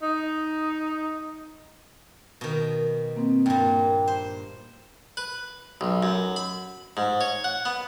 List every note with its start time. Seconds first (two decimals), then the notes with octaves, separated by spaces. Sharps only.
0.02 D#4
2.41 B2 D#3
3.16 A#3 C4
3.46 G2 A#2 G5
4.07 C5
5.17 B4
5.81 B1
6.03 F#2
6.36 B5
6.97 G#2
7.21 C#5
7.44 F#5
7.65 B3